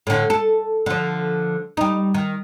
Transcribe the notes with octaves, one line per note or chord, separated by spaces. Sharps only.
A2 D3
A4
D3 F3
G3 D#4
D#3